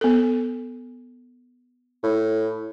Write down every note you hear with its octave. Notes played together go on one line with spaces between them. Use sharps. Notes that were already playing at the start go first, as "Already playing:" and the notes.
B3 A4
A2